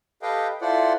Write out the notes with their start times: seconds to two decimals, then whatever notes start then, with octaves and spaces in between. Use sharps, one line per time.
0.22 G4 A4 B4 D#5 F5 G5
0.61 E4 F4 A4 C5 D5 F#5